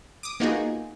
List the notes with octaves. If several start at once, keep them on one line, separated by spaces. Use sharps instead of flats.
D6 D#6
A#3 B3 D#4 F4 F#4 G#4